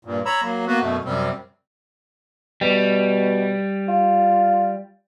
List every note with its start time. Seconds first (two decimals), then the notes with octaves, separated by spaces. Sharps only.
0.05 G2 A#2
0.25 C#5 A#5 B5 E6
0.43 F#3 A#3
0.67 A#3 B3 F#4 B4
0.81 F#2 B2 A3
1.05 F#2 C3 G3 C4
2.61 B2 G3
3.88 F4